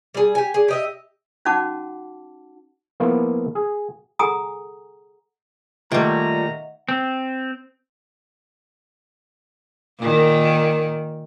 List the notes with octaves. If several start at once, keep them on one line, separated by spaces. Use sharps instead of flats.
G3 G#4
G4 G#5
G#4 D5
G4 D#5 E5
C#4 D#4 F#4 F#5 A5 D6
F3 A#3 B3 E4 F4
G#4
G#4 A4 F#5 G#5 A#5 D#6
A#2 D#3 G3 A3 D#5 E5 F#5 A#5
C4
A#2 D#3